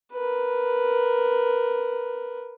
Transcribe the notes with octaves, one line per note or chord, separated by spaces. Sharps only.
A#4 B4